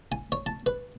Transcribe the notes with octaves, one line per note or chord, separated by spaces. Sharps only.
G#5
C#5
A5
B4